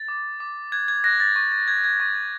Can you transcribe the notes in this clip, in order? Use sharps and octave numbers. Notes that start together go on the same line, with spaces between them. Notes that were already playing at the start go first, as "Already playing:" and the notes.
Already playing: A6
D6
D6
F#6 G#6
G#6
F#6 A#6
A6
C#6 A6
A6
G6 G#6
G#6
C#6 A6